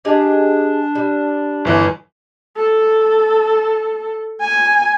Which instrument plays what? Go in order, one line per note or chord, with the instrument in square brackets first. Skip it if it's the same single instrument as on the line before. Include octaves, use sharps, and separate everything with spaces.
[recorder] D4 [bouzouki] G4 G#4 D#5
[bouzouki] G3
[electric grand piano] G1 E3
[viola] A4
G#5